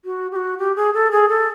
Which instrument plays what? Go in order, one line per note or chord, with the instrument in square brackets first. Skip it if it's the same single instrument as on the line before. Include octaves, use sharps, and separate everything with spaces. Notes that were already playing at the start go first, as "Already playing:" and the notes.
[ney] F#4
G4
F#4
G4
G#4
A4
G#4
A4